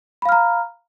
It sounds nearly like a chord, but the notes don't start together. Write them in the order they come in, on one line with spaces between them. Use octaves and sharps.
B5 F5 F6 A#5